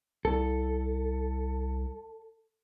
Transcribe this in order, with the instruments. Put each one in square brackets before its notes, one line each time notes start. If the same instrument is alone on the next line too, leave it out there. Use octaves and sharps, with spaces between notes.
[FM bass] C2 [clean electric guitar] A4